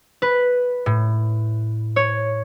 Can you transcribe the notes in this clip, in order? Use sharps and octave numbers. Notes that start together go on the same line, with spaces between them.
B4
A2
C#5